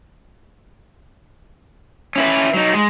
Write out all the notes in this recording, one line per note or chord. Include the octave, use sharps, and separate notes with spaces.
C#4 E4 B4
F#3 D#4
G#3